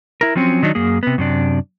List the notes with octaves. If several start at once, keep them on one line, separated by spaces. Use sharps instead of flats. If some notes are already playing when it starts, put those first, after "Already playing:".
E4 A#4
F3 F#3 C4 C#4
D#3 F#3 D4 D#4
F#2 A#3 G#4
C3 B3
F#2 C3 D4